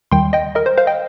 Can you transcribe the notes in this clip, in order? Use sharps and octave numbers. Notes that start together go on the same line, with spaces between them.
D#2 D#3 G3 G5 C6
D#5 G5
A#4 D#5
C5
C5 F5
D#5 G5